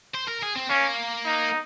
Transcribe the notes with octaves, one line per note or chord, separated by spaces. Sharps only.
C5
A#4
G#4
C4
A#3 C#4
D#4